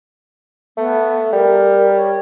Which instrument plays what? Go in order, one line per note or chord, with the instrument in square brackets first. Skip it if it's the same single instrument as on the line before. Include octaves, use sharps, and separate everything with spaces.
[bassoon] A3 [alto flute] B3
[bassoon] G3 [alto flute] A#4
[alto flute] C#5